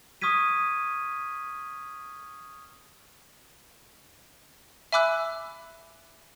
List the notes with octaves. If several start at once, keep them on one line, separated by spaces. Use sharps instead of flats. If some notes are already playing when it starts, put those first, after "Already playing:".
C#6 D#6 F6 G#6 B6 D#7
E5 G#5 B5 D6 E6 F#6